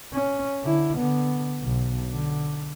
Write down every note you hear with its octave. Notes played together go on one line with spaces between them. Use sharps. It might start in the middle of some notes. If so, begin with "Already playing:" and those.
C#4
D3 E4
D3 B3
B1
D3